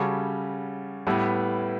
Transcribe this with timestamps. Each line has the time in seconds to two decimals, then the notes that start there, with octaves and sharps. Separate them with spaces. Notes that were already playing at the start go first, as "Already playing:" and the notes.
Already playing: C#3 G3 C#4 F#4 A4
1.07 A2 G3 B3 E4 B4